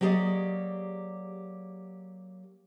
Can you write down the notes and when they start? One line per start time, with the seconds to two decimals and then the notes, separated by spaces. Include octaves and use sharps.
0.01 F#3 A#3 G4 G#4 D5 D#5